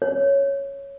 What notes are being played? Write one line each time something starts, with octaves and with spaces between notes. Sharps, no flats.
C#5